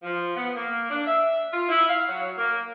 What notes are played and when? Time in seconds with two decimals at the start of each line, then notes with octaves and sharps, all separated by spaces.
0.03 F3
0.36 B3
0.56 A#3
0.90 D4
1.07 E5
1.51 F4
1.69 E4
1.88 F5
2.08 F#3
2.38 A#3